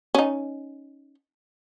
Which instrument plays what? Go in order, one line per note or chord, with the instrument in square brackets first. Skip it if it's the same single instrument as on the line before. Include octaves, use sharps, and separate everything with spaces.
[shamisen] C#4 D#4